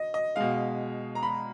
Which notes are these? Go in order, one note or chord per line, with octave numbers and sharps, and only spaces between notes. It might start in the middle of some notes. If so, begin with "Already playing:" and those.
Already playing: D#5
D#5
B2 G#3 F5
A#5
B5